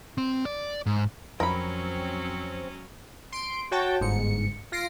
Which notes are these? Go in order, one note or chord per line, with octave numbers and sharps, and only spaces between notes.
C4
D5
G#2
F2 F#3 C4 C#4 A#4 B5
C6 D7
F#4 C#5 G5 A5
G1 G#2 C#7
F4 A#6 C7 D7